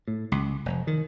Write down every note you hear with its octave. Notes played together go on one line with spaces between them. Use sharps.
A2
C#2
F1
D#3